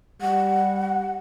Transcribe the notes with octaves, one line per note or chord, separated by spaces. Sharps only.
G3 F#5